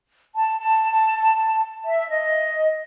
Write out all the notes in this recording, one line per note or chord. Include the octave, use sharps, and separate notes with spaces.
A5
A5
E5
D#5